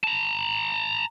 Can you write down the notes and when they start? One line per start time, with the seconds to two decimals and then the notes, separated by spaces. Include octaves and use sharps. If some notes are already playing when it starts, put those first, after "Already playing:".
0.04 A5 A#5